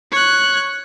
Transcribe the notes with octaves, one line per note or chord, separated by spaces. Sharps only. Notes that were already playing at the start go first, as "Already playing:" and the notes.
C#5 F#6